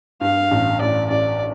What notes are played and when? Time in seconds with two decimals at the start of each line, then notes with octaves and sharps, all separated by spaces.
0.21 G2 F5
0.51 A1
0.81 A1 D5
1.09 A1 D5